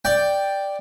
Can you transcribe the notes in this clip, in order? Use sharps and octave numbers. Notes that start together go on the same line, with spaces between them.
D5 G5